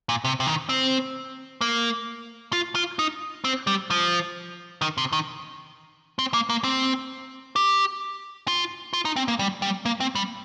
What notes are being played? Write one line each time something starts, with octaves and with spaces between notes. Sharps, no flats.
A#2
C3
C3
D#3
C4
A#3
F4
F4
D#4
C4
G3
F3
D#3
C3
D#3
C4
A#3
A#3
C4
G4
F4
F4
D#4
C4
A#3
G3
G3
A#3
C4
G3